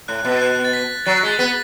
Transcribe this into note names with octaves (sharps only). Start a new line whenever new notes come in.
A2 F#6
B2
F#6
A6
B6
F#3 A6
G#3 A6
B3 B6